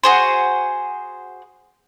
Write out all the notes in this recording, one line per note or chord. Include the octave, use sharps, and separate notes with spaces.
F#4 G#4 C5